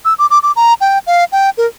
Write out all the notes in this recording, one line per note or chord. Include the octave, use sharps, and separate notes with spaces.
E6
D6
D6
D6
A#5
G5
F5
G5
A#4